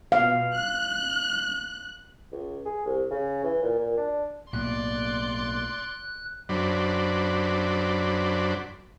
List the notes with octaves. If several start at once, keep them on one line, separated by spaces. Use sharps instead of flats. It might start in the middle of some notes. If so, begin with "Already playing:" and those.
B2 F5
F#6
C#2
G#4
C2
C#3
E3
A#2
A#2
D4
B1 A2 A#3 D5 C6 F#6
F#2 F#3 D4 C5 D5 B5